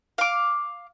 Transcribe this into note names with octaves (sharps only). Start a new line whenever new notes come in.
F5 D6